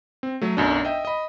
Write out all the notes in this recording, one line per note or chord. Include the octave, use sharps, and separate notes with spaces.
C4
F#3 A3
B1 F#2 D4
D#5 E5 G5
D#5 B5